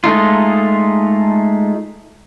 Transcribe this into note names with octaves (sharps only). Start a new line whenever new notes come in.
G#3 A3 D#4 F4